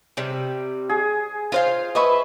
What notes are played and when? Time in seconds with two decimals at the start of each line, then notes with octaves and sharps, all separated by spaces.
0.17 C3 G3
0.89 G#4
1.52 F4 C5 F5
1.95 B4 D#5 E5 B5 C#6 D#6